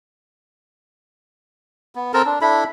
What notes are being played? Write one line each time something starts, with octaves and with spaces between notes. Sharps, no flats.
B3
C4 A4 A#4 A5
D4
D4 E4 A4 B5